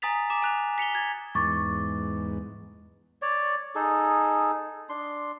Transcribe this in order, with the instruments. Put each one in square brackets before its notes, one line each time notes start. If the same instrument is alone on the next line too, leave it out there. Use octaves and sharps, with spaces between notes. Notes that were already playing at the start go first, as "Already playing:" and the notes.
[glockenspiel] G#5 A#5 D#6 A6 B6 F7
D6 E7
G#5 F#6 F7
B6 C#7 F7 G7
G#6 A6
[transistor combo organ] E2 G#2 [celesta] C#6 D6 A6
[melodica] C#5 D5
D#4 G#4 A4
D4 C6